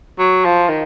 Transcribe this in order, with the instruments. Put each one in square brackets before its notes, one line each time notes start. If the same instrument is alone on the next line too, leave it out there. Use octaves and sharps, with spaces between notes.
[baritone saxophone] F#3
F3
D#3